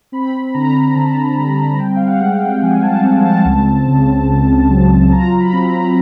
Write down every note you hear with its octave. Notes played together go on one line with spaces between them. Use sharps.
C4 B5
D3 A#5
D3 A5
G3
C4 G5
F5
F#5
G#3
G5
F3 G#5
A5
C4
A5
C#2
C#3
C#2
F#3
F4 A#5
B5
C4
A#5